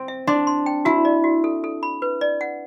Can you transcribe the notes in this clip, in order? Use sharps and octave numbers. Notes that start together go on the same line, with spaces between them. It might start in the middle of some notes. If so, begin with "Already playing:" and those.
Already playing: C4
E5
D4 C6
C6
G5
E4 F#4
D5
F#4
A4
A4
B5
B4
D5
F#5